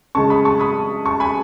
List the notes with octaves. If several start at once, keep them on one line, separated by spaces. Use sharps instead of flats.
C#3 G#3 C#4 A5 C#6
B5 D#6
A5 C#6
B5 D#6
A5 C#6
G#5 B5